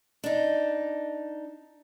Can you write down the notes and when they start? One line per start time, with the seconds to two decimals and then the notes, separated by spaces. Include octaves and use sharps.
0.24 D4 D#4